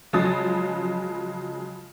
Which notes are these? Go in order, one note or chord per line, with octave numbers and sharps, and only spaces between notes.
C#3 F3 F#3 G#3 D#6 A6